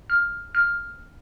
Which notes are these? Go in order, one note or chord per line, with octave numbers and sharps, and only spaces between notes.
F6
F6